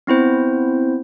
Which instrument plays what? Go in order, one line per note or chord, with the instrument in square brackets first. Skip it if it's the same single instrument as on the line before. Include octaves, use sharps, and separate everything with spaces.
[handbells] B3 C4 E4 C5